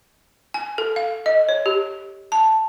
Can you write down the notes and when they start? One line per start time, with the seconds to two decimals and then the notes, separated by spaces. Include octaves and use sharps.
0.54 G#5
0.78 A4
0.96 F5
1.26 D#5
1.49 C#5
1.66 G4
2.32 A5